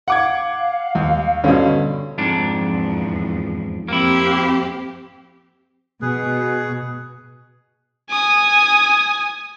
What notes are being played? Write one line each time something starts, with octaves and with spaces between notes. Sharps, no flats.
F5 F#5 D6 G#6
D#2
G2 B2 D3 C#4
F2 G#2 D4
E2 F3
F2 A#3 C4 E4 G4
B2 G#4 B4
G#5 D#6